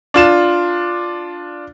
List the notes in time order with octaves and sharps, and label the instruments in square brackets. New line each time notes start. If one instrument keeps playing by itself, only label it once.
[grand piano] D4 F4 E7